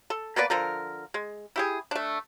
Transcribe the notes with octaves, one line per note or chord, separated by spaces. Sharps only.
A4
A#3 B3 B4 D5
D3 F3 A#4
G#3
E4 G4 G#4
A3 D4